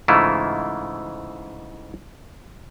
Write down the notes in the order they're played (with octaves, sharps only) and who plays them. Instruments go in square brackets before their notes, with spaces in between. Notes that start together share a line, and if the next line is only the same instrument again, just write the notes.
[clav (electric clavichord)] G#2 C#3 E3 A3 E4 F4